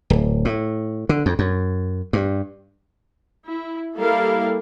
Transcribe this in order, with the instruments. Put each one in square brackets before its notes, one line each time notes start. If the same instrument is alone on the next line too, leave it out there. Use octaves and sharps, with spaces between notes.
[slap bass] D1
A2
D3
F2
F#2
G2
[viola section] E4
G3 A#3 E4 A4 A#4 F5